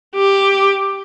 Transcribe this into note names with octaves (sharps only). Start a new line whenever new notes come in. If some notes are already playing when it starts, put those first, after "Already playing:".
G4